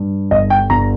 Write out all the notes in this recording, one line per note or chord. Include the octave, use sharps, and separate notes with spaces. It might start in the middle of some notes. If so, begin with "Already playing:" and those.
Already playing: G2
G1 D#5
G5
G1 A#5